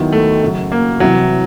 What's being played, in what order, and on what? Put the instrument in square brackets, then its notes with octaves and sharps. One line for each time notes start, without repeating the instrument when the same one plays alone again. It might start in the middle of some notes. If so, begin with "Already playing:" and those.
Already playing: [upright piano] D#2 D#3 F#3 B3 E4
[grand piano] A3
[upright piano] F#2 C#3 F#3
[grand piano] A#3
[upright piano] C2 C3 E3 [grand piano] F#3